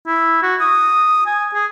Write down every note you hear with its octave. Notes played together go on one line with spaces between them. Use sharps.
E4
F#4
D#6
G#5
G#4